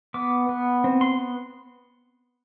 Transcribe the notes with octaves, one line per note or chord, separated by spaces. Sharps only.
B3 D6
B3
C4
C6